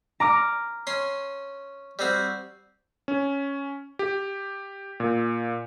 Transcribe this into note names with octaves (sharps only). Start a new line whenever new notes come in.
A#5 D6 F6
C#4 C6
G3 C4 F#4
C#4
G4
A#2